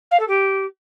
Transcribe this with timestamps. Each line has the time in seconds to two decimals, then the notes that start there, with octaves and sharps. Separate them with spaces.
0.11 F5
0.19 A4
0.28 G4